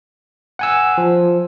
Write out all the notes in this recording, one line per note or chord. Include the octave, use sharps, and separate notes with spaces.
F#5 G#5 E6
F3